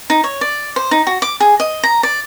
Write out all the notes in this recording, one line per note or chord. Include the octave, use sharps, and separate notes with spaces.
D#4
C#5
D5
C5
D#4
F#4
D6
G#4
D#5
A#5
D5